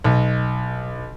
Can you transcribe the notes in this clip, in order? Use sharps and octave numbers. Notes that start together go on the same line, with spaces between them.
B1